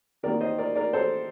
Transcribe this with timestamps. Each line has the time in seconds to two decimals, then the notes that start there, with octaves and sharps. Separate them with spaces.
0.23 C3 D#3 A#3 D#4 A#4 D5
0.41 C5 D#5
0.58 A#4 D5
0.76 A#4 D5
0.93 A4 C5